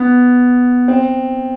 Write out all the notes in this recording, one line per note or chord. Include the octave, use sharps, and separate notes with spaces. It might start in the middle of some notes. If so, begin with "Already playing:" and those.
Already playing: B3
C4